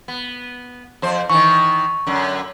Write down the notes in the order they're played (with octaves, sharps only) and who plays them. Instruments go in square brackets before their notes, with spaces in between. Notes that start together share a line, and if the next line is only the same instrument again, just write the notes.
[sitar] B3
F2 C5
[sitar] D#3 E3 [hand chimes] C#6
[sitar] F#2 D3